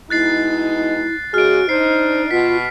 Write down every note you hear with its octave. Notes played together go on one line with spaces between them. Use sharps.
B2 G#3 D#4 E4 F#6 A6 C7
C#3 G#3 F#4 G#4 F6 D7
D4 D#4 C5 C7
B2 F4 B6